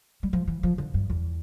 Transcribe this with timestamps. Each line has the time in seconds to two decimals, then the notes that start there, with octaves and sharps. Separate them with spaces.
0.23 G3
0.33 F3
0.47 E3
0.63 F3
0.78 D3
0.94 G2
1.10 E2